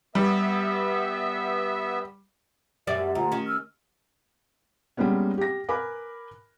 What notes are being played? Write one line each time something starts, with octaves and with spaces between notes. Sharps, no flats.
G3 B3 E5
F#2 G3 D5 E5
D2 F4 F#5 A#5
D#3 C#4
E6 F6
G3 G#3 A#3 B3 C#4
G4 A#6
A#4 B4 G#5 B5 D6